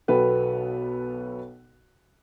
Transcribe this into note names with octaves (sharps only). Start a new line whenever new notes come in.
B1 B2 B3 A4 B4 G5